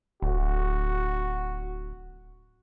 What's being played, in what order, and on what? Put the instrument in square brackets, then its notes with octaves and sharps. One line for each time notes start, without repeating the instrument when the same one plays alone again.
[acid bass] D1 [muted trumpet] F#4